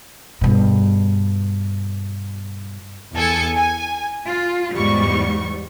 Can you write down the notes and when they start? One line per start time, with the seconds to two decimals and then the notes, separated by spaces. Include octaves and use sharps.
0.41 G2 B2
3.14 E2 A4 G#5 C#7
3.56 G#5
4.25 F4
4.74 E2 G#2 G3 C#6